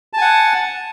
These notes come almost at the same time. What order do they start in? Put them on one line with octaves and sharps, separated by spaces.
A5 G#5 F#5